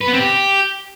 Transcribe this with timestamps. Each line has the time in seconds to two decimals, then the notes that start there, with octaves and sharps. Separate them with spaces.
0.01 B4
0.07 B3
0.13 C4
0.19 G4